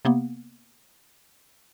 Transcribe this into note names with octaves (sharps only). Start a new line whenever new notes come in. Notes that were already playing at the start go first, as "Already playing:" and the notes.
C3 A#3 B3